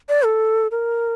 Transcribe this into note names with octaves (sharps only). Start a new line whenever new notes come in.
D5
A4
A#4